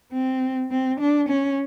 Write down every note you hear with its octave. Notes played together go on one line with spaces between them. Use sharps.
C4
C4
D4
C#4